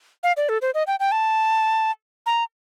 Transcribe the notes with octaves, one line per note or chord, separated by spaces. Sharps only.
F5
D5
A4
C5
D#5
G5
G5
A5
A#5